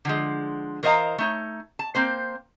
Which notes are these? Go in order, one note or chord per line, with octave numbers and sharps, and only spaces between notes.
D3 F3 G#3
E3 A#4 C5 D#5 F5 A#5
A3 D#4 C#5
A5
A#3 C4 C5